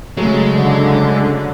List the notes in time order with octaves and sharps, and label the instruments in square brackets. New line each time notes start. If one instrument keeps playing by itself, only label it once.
[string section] C#3 [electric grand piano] F#3 A3 [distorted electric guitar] G#3
[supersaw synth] D3